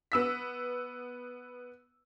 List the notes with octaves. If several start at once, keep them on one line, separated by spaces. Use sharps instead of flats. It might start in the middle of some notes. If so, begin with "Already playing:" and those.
B3 E6 B6